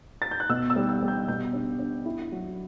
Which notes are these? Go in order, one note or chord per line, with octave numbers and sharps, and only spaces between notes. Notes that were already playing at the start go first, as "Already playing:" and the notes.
A6
G6
F#6
B2 E6
E6
G3
E6
G3
G6
B2 G6
D4
D4
E4
F#3